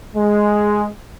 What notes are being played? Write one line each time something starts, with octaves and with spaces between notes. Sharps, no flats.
G#3